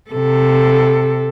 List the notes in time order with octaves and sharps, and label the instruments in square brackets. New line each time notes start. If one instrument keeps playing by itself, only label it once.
[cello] C3 A4